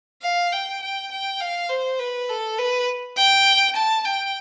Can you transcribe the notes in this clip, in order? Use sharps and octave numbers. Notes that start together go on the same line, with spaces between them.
F5
G5
G5
G5
F5
C5
B4
A4
B4
G5
A5
G5